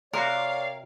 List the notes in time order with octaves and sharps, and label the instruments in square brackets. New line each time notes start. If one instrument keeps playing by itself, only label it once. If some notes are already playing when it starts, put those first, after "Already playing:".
[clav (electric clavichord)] C3 F#4 [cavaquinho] A#4 [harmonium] C#5 D5 [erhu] F5